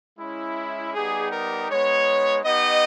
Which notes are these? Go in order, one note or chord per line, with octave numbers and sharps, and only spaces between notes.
G#3 C#4 E4
G3 B3 D#4 G4 G#4
A#4
G#3 B3 D#4 C#5
B3 D#4 G4 D#5